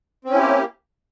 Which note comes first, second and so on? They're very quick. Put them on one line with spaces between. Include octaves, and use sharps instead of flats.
C4 C#4 E4 G4 A#3